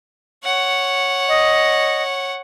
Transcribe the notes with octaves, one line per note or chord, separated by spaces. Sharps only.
C#5 F#5
D#5